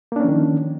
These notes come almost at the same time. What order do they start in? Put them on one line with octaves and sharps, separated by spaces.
A#3 D4 C#4 F3 D#3